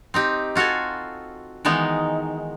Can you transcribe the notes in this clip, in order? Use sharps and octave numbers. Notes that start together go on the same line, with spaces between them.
C4 D#4 G4
F4 F#4 A4 F5 G#5
D#3 E3 G#3 B3 D#4